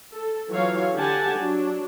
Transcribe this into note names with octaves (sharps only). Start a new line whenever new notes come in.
A4
E3 F#3 F4 A4 C#5 F5
D3 D4 G4 F#5 G#5 A5
F#3 D4